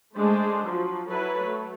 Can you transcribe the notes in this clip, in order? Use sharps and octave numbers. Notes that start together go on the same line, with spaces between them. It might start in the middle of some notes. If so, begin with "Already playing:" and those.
G#3 A3 D4 C5
F3 F#3
F#3 E4 A4 B4 C#5
F#3 A3